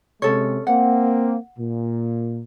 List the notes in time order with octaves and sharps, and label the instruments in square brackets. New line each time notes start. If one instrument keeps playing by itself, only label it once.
[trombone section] C3 G#3 [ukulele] C#4 A4 C#5
[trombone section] A#3 C4 [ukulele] F#5
[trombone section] A#2